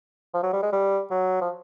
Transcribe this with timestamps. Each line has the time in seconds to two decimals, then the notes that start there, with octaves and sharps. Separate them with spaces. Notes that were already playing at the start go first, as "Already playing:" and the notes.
0.34 F3
0.43 F#3
0.53 G3
0.62 G#3
0.72 G3
1.11 F#3
1.41 F3